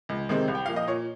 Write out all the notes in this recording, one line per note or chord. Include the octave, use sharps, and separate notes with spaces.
C#2
C3 D#3 G#3 C4
C2
G5
A#2 F3 F5
D#5
A#2 C#5